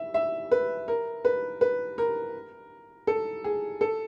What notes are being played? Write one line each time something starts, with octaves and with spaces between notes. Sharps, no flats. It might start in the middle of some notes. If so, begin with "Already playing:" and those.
Already playing: E5
E5
B4
A#4
B4
B4
A#4
A4
G#4
A4